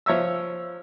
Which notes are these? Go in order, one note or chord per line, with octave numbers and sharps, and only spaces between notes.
F3 C#5 E5 E6